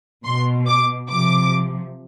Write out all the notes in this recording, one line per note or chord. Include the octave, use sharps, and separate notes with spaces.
B2 C6
D6
C3 F3 D6